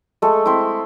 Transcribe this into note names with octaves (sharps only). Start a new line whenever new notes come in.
G#3 A3 A4
C4 E4 C5